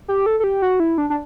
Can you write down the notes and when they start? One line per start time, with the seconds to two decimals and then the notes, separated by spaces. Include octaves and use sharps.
0.08 G4
0.26 A4
0.40 A4
0.44 G4
0.62 F#4
0.80 E4
0.98 D4
1.10 D4